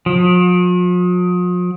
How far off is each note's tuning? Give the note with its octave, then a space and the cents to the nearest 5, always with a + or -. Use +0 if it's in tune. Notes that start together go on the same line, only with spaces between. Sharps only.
F3 +45